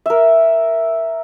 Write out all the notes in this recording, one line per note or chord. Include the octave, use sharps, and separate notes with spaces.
A#4 E5